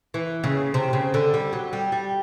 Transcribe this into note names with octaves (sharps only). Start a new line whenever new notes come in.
E3
C#3
C3
C#3
D3
G3
F#3
G3
G3